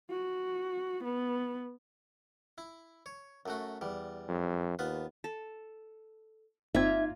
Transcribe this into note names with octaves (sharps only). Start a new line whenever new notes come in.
F#4
B3
E4
C#5
F#2 A3 F#4
E2 G3
F2
D#2 B3 F4 B4
A4
G1 A#3 C4 D#4 F4 E5 G#6